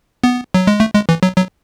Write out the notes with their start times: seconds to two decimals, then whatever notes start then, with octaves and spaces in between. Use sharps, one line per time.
0.24 B3
0.54 F#3
0.67 G#3
0.80 A3
0.94 G#3
1.09 E3
1.23 F#3
1.37 F#3